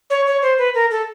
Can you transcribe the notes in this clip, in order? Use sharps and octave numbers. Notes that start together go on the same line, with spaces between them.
C#5
C#5
C5
B4
A#4
A4